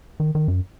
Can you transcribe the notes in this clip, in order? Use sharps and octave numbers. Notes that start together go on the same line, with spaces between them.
D#3
D#3
F#2